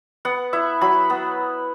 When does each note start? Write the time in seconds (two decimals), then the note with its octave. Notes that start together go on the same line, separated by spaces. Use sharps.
0.25 B3 F#5
0.53 E4 E5
0.81 F#3 B5
1.10 B3